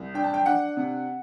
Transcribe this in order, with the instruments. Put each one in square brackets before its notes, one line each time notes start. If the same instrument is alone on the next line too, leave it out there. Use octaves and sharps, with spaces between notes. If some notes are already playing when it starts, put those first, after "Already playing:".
Already playing: [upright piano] C2
D4 G5
A5
G5
D4 F#5
C3